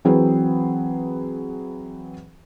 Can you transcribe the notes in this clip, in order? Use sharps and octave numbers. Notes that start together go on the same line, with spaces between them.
E3 F#3 C4 G#4 B4